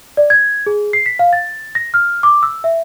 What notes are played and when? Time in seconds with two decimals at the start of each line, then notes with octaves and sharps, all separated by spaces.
0.17 D5
0.30 G#6
0.66 G#4
0.93 C7
1.06 B6
1.19 F5
1.33 A6
1.75 A#6
1.94 F6
2.23 D6
2.43 E6
2.64 E5